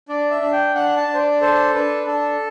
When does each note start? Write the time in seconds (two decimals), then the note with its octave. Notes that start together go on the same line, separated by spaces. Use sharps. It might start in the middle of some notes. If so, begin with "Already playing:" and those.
0.09 D4 D5
0.31 E5
0.41 D4
0.52 G5
0.75 D4 F#5
0.96 A5
1.07 D4
1.14 C5
1.18 D5
1.41 A4 C5
1.74 D4 B4
2.07 D4 A4